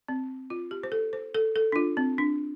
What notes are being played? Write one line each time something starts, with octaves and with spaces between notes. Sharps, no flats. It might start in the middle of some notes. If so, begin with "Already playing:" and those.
C4
F4
G4
C5
A4
C5
A4
A4
D4
F4
C4
D4